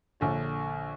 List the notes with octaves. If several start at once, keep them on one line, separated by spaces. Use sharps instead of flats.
A#1 D3 C#5